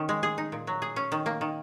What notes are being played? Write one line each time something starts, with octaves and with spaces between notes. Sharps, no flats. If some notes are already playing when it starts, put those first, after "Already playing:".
Already playing: D#3 C#4
G#3
G#4
D#4
A#2
F#3
G#4
C#4
D#3
A#3
D#3